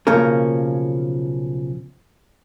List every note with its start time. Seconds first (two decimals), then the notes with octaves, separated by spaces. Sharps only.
0.07 B1 C#3 F3 A#3 C#4 A#4